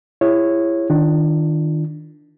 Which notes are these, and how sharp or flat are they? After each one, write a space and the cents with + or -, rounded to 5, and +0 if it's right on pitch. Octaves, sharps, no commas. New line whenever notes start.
E4 +30 G#4 -35 C#5 -15
D#3 +0 D4 +10 F4 -30